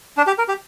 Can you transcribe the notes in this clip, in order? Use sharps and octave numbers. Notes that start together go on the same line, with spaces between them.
D4
G4
A#4
G4